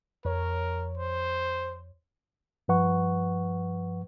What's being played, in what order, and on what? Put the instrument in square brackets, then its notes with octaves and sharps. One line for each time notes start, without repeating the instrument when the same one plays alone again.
[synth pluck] F2 C#5 [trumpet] A#4
[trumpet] C5
[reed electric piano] G2 F3 B4 F#5 C#6